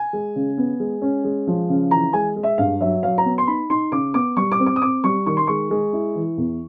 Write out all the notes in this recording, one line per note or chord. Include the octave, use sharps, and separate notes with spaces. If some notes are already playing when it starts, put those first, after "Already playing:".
Already playing: G#5
G#3
C#3
B3
G#3
C#4
G#3
F3
C#3
E3 A#5
G#3 G#5
G#3
E5
G2 F5
F#3 E5
F#3 F5
A#5
B3
C6
D#4 B5
D#4 C6
C#3 D6
B3 D6
G3 C#6
D6
C4
D6
D#6
C4 D6
G3 C#6
D#3 C#6
C6
G#3 C#6
G#3
E4
E3
E2